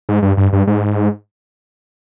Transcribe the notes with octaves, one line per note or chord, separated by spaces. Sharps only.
G#2
G2
G2
G2
G#2